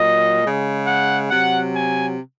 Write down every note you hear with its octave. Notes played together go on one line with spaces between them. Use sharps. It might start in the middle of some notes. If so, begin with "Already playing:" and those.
Already playing: A#2 F#3 D#5
C#3 G#3
F#5
C3 F#3 F#5
G#5